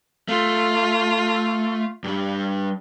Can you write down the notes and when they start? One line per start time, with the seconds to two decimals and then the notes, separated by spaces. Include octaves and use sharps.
0.28 A3 F4
2.04 G2 G3